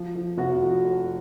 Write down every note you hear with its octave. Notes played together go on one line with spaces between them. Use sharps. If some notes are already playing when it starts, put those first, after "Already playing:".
Already playing: F3
F3
F1 F#4
F3
F2